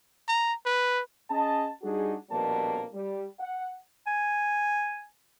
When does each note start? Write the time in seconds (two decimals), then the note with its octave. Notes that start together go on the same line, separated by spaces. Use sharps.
0.28 A#5
0.66 B4
1.30 C#4 G#4 D#5 A5
1.82 G3 D4 D#4 F#4 G#4
2.30 A#1 F2 B2 G3 A#3 A5
2.93 G3
3.40 F#5
4.07 G#5